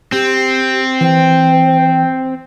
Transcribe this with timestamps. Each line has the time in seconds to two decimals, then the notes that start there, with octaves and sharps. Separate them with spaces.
0.12 C4 G4
1.01 E3 C5 G5